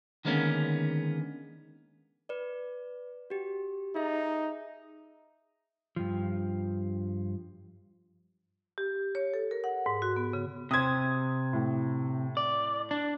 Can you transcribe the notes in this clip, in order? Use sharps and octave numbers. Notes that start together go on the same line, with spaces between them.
D3 D#3 G#3 A#3 B3 C#4
B4 D5
F#4 G4
D#4 G#4 E5
G2 F3
G4
C#5
A4
A#4
F#5
G#2
F#4
B3
C#3
C3 C5 D#6 G#6
A2
D5
D4